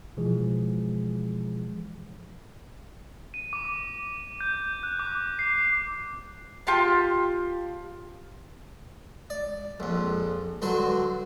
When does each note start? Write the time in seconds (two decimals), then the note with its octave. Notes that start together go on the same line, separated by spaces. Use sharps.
0.17 B2 E3 F3 G#3 G#4
3.34 D#7
3.53 D6
4.40 G6
4.83 F#6
4.99 D6
5.39 C7
6.67 F4 G4 A5
9.30 D5
9.80 A#1 F2
10.62 G2 D3 F#3 F#4 C6